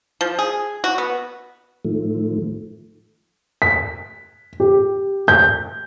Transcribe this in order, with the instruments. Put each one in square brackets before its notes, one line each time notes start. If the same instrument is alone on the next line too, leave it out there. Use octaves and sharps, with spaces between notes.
[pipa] F3
G#4
F#4
B3
[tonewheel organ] A2 D#3 F3 A3
[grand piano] B6
G4
G6